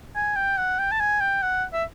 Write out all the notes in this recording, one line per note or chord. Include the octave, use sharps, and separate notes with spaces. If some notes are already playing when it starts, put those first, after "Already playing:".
G#5
G5
F#5
G5
A5
G#5
G5
F#5
E5